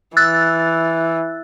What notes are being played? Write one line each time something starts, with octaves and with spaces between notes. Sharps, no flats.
E3 E6 F#6 A6